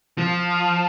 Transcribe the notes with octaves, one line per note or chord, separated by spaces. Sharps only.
F3